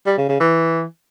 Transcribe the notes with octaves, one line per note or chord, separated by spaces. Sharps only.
G3
C#3
C#3
E3